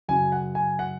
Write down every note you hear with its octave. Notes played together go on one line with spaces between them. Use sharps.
F#2 C#3 G#5
F#5
G#5
F#5